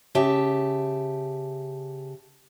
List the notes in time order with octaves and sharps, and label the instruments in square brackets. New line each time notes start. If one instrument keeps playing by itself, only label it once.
[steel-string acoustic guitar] C#3 G4 E5 A5